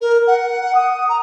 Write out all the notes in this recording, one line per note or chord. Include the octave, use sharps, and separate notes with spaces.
A#4
F#5
D#6
A#5